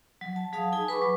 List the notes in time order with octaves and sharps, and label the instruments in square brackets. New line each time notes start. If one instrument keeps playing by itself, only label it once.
[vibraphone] F#3
A5
F#3 G#4 F5 A5 D#6
D#4 G#4 G#5
B4 B5 C#6 D6
F#3